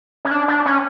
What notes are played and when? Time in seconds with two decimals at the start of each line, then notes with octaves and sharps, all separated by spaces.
0.25 C#4
0.31 D4
0.48 D4
0.66 C#4